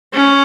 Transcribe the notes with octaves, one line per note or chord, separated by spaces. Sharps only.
C#4